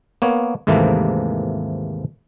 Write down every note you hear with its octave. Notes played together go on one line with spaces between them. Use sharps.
A#3 B3 C#5
D#2 G#2 C3 E3 A3 A#3